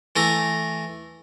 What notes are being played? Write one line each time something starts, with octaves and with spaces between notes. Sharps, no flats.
E3 A3 A#5